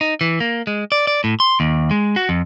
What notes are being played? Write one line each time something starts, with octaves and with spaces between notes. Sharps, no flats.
D#4
E3
A#3
G#3
D5
D5
A2
C6
D#2
G#3
F#4
F2